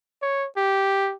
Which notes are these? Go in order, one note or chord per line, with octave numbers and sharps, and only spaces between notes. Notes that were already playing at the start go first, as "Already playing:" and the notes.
C#5
G4